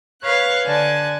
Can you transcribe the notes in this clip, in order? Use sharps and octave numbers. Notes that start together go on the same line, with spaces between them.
B4 C#5 F5 F#6
D3 D5 G#5 A5 F#6